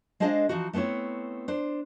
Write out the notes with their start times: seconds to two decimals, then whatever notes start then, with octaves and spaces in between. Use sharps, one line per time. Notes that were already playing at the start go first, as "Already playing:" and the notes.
0.20 G#3 D4 G#4 C5 D#5 F5
0.49 E3 F3 D#4 F#4
0.73 A3 B3 C4 E4 C#5
1.48 D4 C5